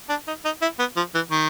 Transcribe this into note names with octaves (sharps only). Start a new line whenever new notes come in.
D4
D#4
D#4
E4
B3
F3
E3
D#3